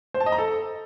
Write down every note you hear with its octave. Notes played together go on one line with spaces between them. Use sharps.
C5
A5
D#5
A#5
A4